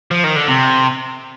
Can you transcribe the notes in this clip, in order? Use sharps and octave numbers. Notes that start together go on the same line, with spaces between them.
F3
D#3
D3
C3